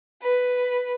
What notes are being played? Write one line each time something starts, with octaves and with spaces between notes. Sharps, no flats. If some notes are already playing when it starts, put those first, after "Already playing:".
B4